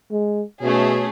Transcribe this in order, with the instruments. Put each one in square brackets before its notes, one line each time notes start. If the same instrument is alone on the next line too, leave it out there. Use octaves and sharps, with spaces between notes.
[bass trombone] G#3
[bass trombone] B2 [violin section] A3 C#4 G#4